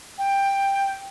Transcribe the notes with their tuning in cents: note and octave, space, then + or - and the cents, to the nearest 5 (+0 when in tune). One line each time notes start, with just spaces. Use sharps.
G5 +10